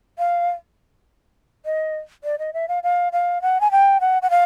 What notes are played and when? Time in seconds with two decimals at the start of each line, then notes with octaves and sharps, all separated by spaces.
0.18 F5
1.65 D#5
2.24 D5
2.39 D#5
2.53 E5
2.68 F5
2.83 F5
3.12 F5
3.42 F#5
3.61 G#5
3.71 G5
4.00 F#5
4.22 F#5
4.30 F5